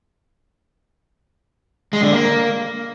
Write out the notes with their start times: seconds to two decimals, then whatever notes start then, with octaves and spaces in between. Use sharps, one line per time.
1.93 G#3
2.02 D3
2.12 A#3